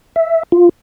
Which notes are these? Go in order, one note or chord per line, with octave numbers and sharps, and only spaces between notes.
E5
F4